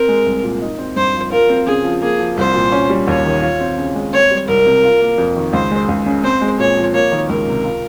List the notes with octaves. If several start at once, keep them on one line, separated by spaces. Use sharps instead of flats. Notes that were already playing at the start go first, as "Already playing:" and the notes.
Already playing: C4 A#4
G#3
C2
A#2
D#4
C4
G2 C5
F3
F4 A#4
C4
C#3 G#4
F3
A#3 G#4
F3
C2 C5
A#2
C#4
G3
D#2 C#5
D#3
F4
C4
C#3
G#3
C4 C#5
G3
C2 A#4
C3
F4
A#3
F2
D#3
C#2 C5
G#3
C#2
C#3
C4 C5
G#3
A#2 C#5
F3
A#3 C#5
D#3
C#2 A#4
C3
F4